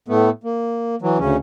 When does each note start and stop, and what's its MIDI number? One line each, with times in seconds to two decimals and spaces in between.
0.08 0.30 45
0.08 0.30 57
0.08 0.30 59
0.44 0.95 58
1.02 1.18 52
1.02 1.18 54
1.18 1.37 38
1.18 1.37 49
1.18 1.37 61